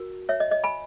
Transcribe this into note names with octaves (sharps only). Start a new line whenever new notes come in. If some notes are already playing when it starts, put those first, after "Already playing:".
Already playing: F#4 A#4
C#5 E5
D#5
D#5
G#5 B5